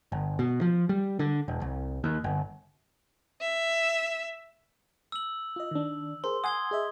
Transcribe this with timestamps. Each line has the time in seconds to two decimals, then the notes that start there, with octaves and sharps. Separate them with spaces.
0.12 G1
0.39 B2
0.61 F3
0.89 G3
1.19 D3
1.48 E1
1.61 C2
2.04 D#2
2.24 G1
3.41 E5
5.12 E6 F#7
5.56 F4 D#5
5.71 D#3 D4
6.24 G#4 A#4 C5 C6
6.44 F#5 G#5 C6 D#6 G#6 G7
6.71 G#4 D#5 E5